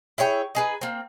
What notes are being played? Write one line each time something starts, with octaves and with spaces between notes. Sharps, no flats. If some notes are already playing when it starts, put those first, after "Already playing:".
E4 G#4 C#5 G5
D#4 G#4 B4
A#3 C4